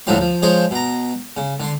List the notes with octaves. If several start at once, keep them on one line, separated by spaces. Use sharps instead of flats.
D2 A2 D3 F3 F#3 C6
F3
F3 G#3 G#4 C5 C#5
B2 A#5
C#3
D3 C6